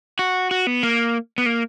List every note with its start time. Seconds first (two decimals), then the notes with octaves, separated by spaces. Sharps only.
0.19 F#4
0.51 F#4
0.67 B3
0.83 A#3
1.38 B3
1.46 A#3